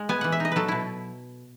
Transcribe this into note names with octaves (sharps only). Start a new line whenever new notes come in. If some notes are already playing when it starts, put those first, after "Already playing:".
Already playing: G#3
B3 G#5
E3 F#5
E5
D#4 D#5
F#3 A4 B4
B2 E4